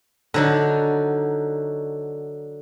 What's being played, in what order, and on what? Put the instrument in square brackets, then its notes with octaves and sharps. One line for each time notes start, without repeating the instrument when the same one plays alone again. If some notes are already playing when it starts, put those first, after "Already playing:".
[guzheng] D3 F#3 D#4